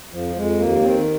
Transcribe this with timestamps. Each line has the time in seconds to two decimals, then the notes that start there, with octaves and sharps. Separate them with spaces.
0.13 F2 F3
0.36 F2 G#3
0.60 D#2 A#3
0.83 D#3 C4